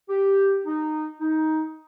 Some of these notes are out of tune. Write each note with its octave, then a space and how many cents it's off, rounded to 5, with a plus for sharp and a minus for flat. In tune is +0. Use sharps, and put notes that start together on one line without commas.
G4 +0
D#4 -15
D#4 +15